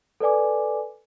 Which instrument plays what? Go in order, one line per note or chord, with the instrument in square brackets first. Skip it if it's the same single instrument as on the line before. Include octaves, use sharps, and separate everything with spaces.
[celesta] A4 B4 D5 G#5 D6